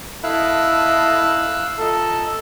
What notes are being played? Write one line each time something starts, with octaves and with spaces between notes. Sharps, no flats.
E4 A4 D#5 F5 A5 E6 F#6
F4 A4 D#5 A#5